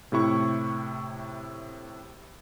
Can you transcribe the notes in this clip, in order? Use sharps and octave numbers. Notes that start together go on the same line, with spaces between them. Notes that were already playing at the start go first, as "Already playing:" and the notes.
A2 C3 E4 C#6